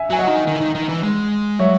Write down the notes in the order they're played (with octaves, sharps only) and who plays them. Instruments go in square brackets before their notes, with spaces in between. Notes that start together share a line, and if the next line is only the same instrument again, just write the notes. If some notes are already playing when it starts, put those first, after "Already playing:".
Already playing: [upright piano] E5 G#5
[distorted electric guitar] F#3 [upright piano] G#5
[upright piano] D#5 F#5
[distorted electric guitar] D#3
D#3
E3
D#3
D#3
E3
G#3
[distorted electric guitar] F#3 [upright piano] C#5 E5